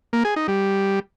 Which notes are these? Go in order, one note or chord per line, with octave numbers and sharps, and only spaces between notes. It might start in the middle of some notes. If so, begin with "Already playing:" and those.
A#3
G#4
D#4
G3